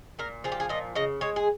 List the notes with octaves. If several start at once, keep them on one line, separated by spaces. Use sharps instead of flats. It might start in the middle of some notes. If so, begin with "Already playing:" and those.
A#2 A#4
F3 G#4
G4
G#4
A#2 D#5
C#3 D#5
G#3 C#5
G#4